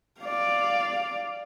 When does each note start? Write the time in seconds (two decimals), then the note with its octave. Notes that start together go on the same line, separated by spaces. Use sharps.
0.21 D5 F5